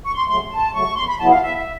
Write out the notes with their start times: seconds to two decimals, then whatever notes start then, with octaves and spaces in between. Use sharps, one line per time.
0.04 F#2 C#6
0.15 C6
0.27 C#3 F#3 A3 C6
0.50 F#2 A5
0.73 C#3 F#3 A3 C#6
0.96 E2 C6
1.07 B5
1.19 C#3 F#3 B3 E4 A5
1.30 F5
1.42 E2 E5
1.57 E5